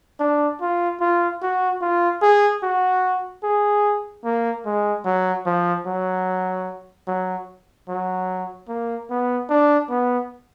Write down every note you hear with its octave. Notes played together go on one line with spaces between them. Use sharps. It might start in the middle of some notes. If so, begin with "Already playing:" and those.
D4
F4
F4
F#4
F4
G#4
F#4
G#4
A#3
G#3
F#3
F3
F#3
F#3
F#3
A#3
B3
D4
B3